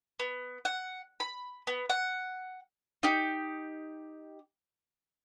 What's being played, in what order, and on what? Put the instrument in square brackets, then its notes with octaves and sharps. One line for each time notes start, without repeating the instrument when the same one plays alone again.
[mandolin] B3
F#5
B5
B3
F#5
D#4 G4